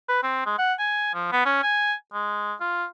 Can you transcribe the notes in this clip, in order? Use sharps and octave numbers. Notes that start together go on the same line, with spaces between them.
B4
C4
G#3
F#5
G#5
F3
B3
C#4
G#5
G#3
F4